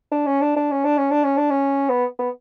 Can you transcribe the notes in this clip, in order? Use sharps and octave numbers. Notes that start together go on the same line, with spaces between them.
D4
C#4
D4
D4
C#4
D4
C#4
D4
C#4
D4
C#4
B3
B3